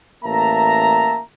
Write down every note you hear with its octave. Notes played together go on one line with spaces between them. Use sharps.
A1 A#3 E5 A5 A#5